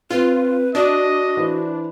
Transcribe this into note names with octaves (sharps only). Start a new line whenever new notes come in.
C4 F4 B4
D4 F#4 D5 D#5
E3 B4 C5